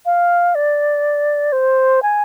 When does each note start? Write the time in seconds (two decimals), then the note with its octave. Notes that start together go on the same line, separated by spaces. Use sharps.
0.06 F5
0.55 D5
1.52 C5
2.03 G#5